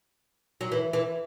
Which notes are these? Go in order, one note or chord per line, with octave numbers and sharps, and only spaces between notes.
F#3
E3
E3